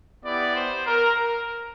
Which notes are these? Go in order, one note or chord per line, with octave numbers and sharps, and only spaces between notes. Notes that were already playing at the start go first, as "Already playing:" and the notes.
B3 E4 G4 D5
C5
A#4